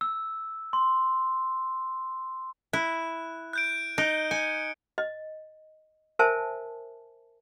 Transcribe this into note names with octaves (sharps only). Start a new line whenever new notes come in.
E6
C6
E4 F#6
F#6 G6 D7
D#4 F#6 D7 G7
G#5 C#7
D#5
A#4 C5 E5 G#5 A5